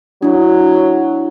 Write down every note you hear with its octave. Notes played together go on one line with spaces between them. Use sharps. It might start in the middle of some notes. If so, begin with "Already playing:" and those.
F#3 D4 E4